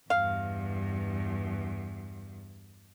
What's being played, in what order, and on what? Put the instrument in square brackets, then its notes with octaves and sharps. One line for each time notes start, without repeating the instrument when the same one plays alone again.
[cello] E2 G2 [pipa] F5